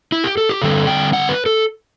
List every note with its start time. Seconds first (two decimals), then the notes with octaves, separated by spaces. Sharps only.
0.12 E4
0.24 G4
0.38 A4
0.49 G4
0.62 D3 G3 C4 A4
0.87 G5
1.13 F#5
1.29 B4
1.46 A4